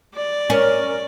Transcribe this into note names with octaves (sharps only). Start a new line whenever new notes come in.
D5
C#4 A#4